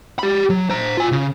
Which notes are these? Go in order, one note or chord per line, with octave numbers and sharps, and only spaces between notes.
G4 B5
F#3
C5 A#5
F4 G#5
C#3